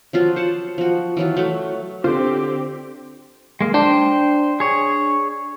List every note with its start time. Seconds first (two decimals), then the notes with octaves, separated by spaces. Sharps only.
0.13 F3 F#3 F4
0.36 C5 F#5 A5
0.78 F3 F#4
1.17 E3 F#3 F4
1.37 F#3 A3
2.04 D3 C4 F4 G4 C5
3.61 G#3 A#3
3.74 D4 C5 G5
4.60 G#4 C#5